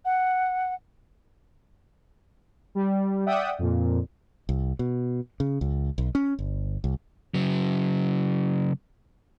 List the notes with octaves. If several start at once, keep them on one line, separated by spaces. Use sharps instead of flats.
F#5
G3
D5 E5 F#5 G5 D#6
F2 A#2
C2
B2
C#3
C#2
B1
C#4
G1
C2
C#3 F#3